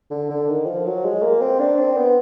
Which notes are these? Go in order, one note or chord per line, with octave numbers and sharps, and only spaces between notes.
D3
D3
D#3
F3
F#3
G#3
A#3
C4
D4
C4
B3